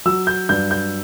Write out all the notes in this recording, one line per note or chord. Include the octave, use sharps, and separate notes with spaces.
F#3 E6
G6
G2 G6
G6